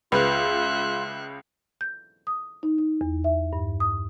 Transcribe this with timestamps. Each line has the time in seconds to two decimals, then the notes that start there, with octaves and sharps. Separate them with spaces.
0.12 C#2 F4 B4 E5 F#6
1.81 G6
2.27 D#6
2.63 D#4
2.78 D#4
3.01 E2
3.24 E5
3.53 G2
3.80 D#6